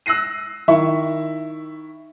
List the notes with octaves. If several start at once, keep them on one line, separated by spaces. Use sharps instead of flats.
E6 F#6 A#6 C7 D#7
D#3 E4 E5 C#6